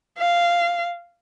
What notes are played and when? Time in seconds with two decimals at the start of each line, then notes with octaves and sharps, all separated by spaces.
0.18 F5